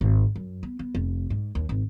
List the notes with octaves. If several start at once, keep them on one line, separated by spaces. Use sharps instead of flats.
G#1
F#2
B3
B3
F1
G#2
D#2
G#1